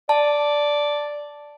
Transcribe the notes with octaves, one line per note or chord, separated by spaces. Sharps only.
D5 A5